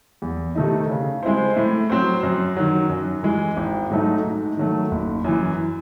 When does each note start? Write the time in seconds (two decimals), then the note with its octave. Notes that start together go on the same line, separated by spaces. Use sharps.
0.22 E2
0.55 C3 D#3 A3 D#4
0.90 C#3
1.23 G#3 C4 E4 C5
1.57 A2
1.90 F#3 C4 F#4 C5
2.23 F#2
2.57 D#3 F#3
2.90 F#2
3.23 E3 G#3
3.57 G#1
3.90 G#2 F#3 A3 D#4
4.24 G#2
4.57 D#3 F#3 A3
4.91 F#1
5.24 F#2 E3